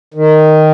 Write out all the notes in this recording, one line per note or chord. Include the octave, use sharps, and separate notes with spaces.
D#3